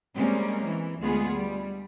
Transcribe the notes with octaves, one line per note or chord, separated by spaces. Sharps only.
G3 G#3 A#3 C4 C#4
E3
D2 G#3 B3 F4 G#4
G3